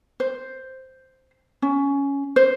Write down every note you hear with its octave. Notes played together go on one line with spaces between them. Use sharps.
C5
C#4
C5